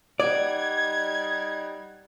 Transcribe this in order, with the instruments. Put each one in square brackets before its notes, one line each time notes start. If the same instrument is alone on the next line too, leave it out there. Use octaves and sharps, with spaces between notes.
[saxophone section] G3 D#4 F#5 [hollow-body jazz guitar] D5 [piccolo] G#6